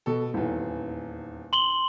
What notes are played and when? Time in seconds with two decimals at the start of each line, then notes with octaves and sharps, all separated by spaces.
0.06 B2 A4
0.34 D#1 E2
1.53 C6 F#7 G7